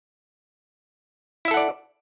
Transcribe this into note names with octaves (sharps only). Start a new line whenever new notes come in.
E4 A4 D5 E5 F#5